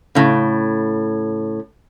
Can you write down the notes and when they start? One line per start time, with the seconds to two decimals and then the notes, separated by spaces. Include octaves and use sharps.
0.15 A2 C#3